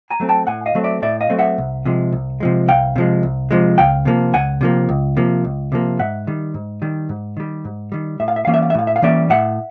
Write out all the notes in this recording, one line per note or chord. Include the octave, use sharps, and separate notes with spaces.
G#5 A#5
F#3 A3 C4
G5 A5
A2 F#5 G#5
D#5 F5
F#3 A3 C4
D5 E5
A2 D5 E5
D#5 F5
F#3 A3 C4
E5 F#5
C2
C3 F3 G#3
C2
C3 F3 G#3
C2 F5 G5
C3 F3 G#3
C2
C3 F3 G#3
C#2 F5 G5
C3 F3 A#3
C#2 F#5 G#5
C3 F3 A#3
C#2
C3 F3 A#3
C#2
C3 F3 A#3
G#2 E5 F#5
D#3 G3
G#2
D#3 G3
G#2
D#3 G3
G#2
D#3 G3
A2 E5
F5
E5
E3 G3 A#3 C#4 F5
E5
F5
E5
A2 F5
E5
F5
E3 G3 A#3 C#4 D5 E5
A2 E5 F#5